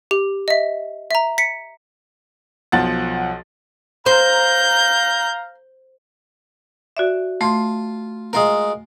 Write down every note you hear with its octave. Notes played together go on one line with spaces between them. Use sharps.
G4
D#5 E5
E5 A#5
B6 C#7
B1 F3 F#5 A6
C5 F5 A#5 G6
F#4 D5 E5
A3 F4 C6
G#3 F4 A#4